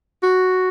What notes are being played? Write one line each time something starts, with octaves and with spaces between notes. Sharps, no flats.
F#4